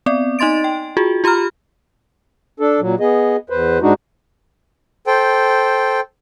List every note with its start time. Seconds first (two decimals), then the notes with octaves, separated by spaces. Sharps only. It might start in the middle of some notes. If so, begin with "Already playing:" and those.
0.06 B3 C4 D5
0.39 D#4 D#5 C6 A6 D7
0.64 G5
0.97 F4 F#4 G#4
1.24 F4 G4 A#5 B5 F6
2.60 D4 A4
2.80 A#2 F#3
3.00 B3 G#4 D#5
3.50 E2 B4 C5
3.82 G#2 G#3 D4 D#4 F#4
5.07 A4 C5 G5